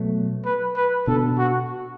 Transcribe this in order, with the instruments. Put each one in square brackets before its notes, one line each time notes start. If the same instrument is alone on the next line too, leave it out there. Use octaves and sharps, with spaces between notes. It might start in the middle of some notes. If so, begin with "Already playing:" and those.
Already playing: [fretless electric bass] B2 F#3 A3
[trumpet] B4
B4
[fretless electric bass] B2 B3 D4 [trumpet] A4
[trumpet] F#4